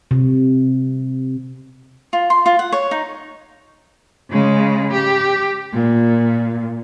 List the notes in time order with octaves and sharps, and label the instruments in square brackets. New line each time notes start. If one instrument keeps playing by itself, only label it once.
[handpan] C3
[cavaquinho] F4
C6
F4
F#5
C#5
D#4
[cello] C#3 G#3
G4
A#2